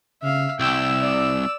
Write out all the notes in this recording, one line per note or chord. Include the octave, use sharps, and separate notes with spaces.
C#3 E5 F5
C2 G5 E6
D5